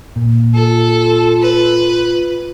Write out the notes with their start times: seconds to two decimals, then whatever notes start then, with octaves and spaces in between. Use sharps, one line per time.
0.16 A#2
0.54 F4 A4
1.42 B4